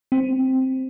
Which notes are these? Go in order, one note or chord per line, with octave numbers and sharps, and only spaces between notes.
C4